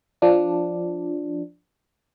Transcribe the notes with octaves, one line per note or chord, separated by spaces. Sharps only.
F3 D4